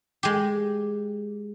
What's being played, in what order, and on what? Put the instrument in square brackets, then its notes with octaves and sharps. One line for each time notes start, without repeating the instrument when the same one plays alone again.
[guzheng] G#3 G4